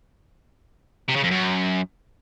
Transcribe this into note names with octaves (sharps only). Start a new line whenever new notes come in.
C3
C#3
F2
F#2